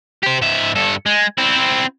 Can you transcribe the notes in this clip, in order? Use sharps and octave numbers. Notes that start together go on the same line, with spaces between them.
G4 C5
G#2 E5
G2 A4
G#3
C4 E4